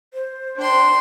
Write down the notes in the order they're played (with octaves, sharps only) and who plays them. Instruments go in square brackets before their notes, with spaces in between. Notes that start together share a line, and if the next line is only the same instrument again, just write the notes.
[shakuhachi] C5
[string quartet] D4 G5 C6